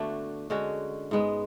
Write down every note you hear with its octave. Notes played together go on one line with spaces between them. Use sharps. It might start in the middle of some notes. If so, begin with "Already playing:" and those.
Already playing: D3 A3 B3 D4 F#4
D3 G#3 C#4 F#4
G#2 G#3 B3